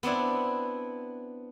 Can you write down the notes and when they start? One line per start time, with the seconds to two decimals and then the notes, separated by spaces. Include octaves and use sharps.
0.03 B3 C4 D4 E4